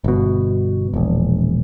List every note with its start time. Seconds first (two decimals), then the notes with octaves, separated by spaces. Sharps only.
0.04 G1 B2
0.94 E1 A#1